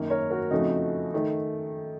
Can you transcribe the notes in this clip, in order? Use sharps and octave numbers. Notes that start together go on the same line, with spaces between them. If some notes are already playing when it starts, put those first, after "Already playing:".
Already playing: F#2 D#3 A#3
A#4 C#5
F#4 A#4
F2 C#3 F3 A3 D#4 F#4
D#3 A3